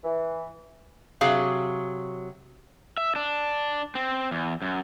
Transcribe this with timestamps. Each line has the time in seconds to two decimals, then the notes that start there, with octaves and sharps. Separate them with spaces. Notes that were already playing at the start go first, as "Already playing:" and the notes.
0.03 E3
1.21 C3 F#3 G#4 F5
2.98 E5
3.16 D4
3.95 C4
4.31 E2
4.62 F#2